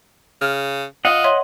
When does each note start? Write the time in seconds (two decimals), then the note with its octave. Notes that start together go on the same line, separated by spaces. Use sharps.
0.41 C#3 F6
1.05 F4 D#5 F#5
1.24 C#5 E5 C6